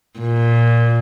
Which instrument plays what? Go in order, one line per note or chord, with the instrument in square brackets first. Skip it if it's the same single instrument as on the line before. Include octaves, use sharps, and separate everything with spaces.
[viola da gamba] A#2